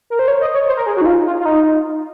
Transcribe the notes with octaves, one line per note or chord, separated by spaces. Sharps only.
A#4
C5
C#5
D#5
C#5
C5
A#4
G#4
F#4
D#4
F4
F4
F4
D#4